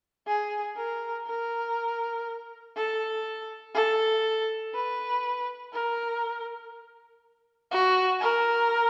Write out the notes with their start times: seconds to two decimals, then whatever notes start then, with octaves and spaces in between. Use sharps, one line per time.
0.27 G#4
0.77 A#4
1.27 A#4
2.76 A4
3.74 A4
4.74 B4
5.73 A#4
7.71 F#4
8.20 A#4